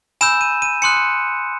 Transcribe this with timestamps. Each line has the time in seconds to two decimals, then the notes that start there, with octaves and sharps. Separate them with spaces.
0.21 G#5 B5 E6 G6 E7
0.41 D#7
0.62 D#7
0.82 G#5 C6 D#6 F#6 C#7